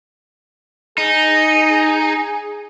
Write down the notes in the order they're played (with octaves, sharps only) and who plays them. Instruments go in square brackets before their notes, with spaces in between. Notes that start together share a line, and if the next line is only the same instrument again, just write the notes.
[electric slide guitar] D#4 [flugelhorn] G#4